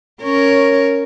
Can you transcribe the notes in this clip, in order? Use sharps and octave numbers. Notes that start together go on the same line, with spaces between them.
C#4 A#4 C#5